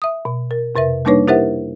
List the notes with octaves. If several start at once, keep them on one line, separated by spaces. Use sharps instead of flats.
E5 D#6
B2
A#4
F2 C3 A#4 B4 E5
G3 A#3 D4 D#4 B4 C#5
E4 G4 A#4 C5 E5 F#5